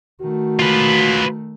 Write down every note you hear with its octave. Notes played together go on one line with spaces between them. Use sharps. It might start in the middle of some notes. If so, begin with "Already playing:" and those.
D#3 A3 F#4
F4 B4